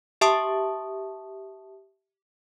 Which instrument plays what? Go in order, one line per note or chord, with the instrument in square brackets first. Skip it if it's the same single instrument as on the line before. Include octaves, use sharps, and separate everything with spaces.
[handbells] G4 E5 A5 C#6 D#6